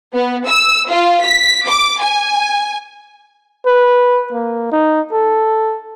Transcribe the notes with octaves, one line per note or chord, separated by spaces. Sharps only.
B3
E6
F4
B6
D6
G#5
B4
A#3
D#4
A4